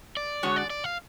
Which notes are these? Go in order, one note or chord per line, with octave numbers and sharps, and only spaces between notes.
D5
D3 G#3 D4 F#4 C#5
D5
D5
F5